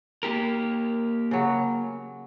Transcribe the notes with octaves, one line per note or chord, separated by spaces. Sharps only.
A#3 G4 A#4
C#3 F#3